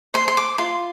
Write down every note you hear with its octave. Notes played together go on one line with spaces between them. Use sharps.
C5 C6
C6
D6
F4 C6